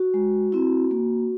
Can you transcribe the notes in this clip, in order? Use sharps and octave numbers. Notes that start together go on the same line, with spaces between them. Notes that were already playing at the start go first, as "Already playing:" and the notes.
Already playing: F#4
G#3
C4 E4
A#3